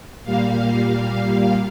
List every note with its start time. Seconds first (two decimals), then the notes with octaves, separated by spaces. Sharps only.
0.24 A#2 G3 A#3 F5